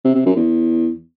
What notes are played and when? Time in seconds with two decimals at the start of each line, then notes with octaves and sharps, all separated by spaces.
0.05 C3
0.15 C3
0.26 F#2
0.36 E2